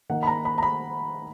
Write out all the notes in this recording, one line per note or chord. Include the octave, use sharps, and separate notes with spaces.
D#3 A#3 D#4 F#5
B5
A#5
B5
A#5
B5